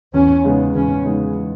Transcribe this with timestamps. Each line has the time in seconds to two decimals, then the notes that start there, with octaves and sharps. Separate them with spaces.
0.14 E2 C#4
0.44 C#3 G#3 B3 D#4
0.75 E2 C#4
1.05 C#3 G#3 B3 D#4